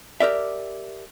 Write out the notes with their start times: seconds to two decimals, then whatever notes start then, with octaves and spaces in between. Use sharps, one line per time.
0.20 G4 A#4 D5 E5